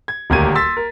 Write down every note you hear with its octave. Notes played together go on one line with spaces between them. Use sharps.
G#6
D#1 D2 A#3 G4 G#6 D#7
C6 E6 A6 B6
A#4